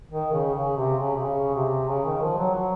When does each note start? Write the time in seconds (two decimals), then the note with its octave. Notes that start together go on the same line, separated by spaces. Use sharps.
0.10 D#3
0.32 C#3
0.55 C#3
0.77 C3
0.99 C#3
1.16 C3
1.22 C#3
1.55 C3
1.88 C#3
2.05 D#3
2.22 F3
2.38 F#3
2.55 F#3